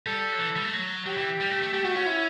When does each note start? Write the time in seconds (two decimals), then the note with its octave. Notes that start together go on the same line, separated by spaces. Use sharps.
0.06 G3 A4
0.33 F#3
0.40 E3
0.56 G3
0.65 A3
0.73 F#3
1.06 F#3 G4
1.17 E3
1.40 G3
1.51 A3
1.62 A3
1.73 A3 G4
1.84 A3 F#4
1.96 C#4 F#4
2.06 E4